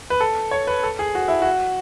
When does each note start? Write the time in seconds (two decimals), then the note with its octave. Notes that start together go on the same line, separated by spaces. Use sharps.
0.10 B4
0.20 A4
0.51 C#5
0.67 B4
0.83 A4
0.99 G#4
1.15 F#4
1.28 E4
1.42 F#4